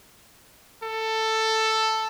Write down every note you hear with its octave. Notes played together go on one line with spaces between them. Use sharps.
A4